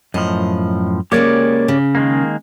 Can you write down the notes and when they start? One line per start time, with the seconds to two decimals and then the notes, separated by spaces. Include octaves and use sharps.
0.14 F#2 A2 F3 D#5
1.12 C#3 G#3 A#3 G4 C#5 D5
1.68 C#3
1.95 D#3 G#3 A#3